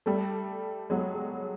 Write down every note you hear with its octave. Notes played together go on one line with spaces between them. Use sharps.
G3 A3
F#3 G#3